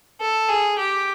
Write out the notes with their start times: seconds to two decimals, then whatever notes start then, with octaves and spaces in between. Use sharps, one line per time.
0.21 A4
0.49 G#4
0.79 G4